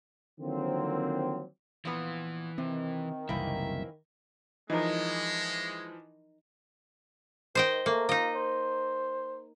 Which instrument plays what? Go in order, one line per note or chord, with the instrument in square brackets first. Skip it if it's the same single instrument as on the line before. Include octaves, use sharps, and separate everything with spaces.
[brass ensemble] D3 D#3 F3 F#3 A#3 C4
[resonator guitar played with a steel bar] A#2 F3 B3 [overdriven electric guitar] E3
[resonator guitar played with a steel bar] C3 [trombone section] D#3 [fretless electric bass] C4
[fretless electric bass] F#1 C2 [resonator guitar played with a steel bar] E3 A#3 C4 [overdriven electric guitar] E5
[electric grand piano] E3 F3 [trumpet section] G#3 [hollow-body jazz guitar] D#4 A#4
[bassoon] D#3 [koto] C5 D#5 G5
[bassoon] A3 [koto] A#3
[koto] D#4 D#5 [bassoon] F4
[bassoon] C5